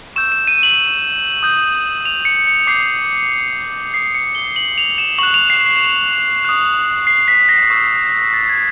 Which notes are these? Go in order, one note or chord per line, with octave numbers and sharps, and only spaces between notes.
C#6 E6 G6 E7
E7
D#7
F#7
D#6 G6
F7
C#7
C#7
D6 G6 C7
D#6 G6 C7
C#7
G7
F#7
F7
E7
C#6 F#6 F#7
F7
C7
C7
D#6 F#6
C7
B6
A#6
C#6 E6 G6
A6
G#6